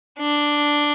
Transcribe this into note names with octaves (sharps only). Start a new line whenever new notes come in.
D4